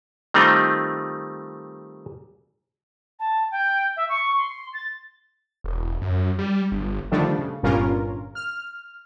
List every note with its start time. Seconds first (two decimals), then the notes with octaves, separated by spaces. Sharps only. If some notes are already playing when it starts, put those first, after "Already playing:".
0.34 D#3 G3 A3 C4 D#4 F4
3.19 A5
3.51 G5
3.97 E5
4.09 C#6
4.37 C6
4.73 A6
5.64 E1
6.02 F#2
6.39 G3
6.72 G1
7.12 D3 D#3 F3 G3 A3 D4
7.39 C#3
7.63 G1 G2 A#2 C#4 F4 A#4
8.35 F6